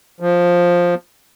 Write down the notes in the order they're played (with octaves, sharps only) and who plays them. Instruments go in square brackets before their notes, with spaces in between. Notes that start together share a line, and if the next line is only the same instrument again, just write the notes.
[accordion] F3